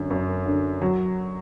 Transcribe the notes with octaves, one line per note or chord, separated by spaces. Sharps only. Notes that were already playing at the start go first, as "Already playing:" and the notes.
Already playing: F#2 D3
F#2
D3
F#3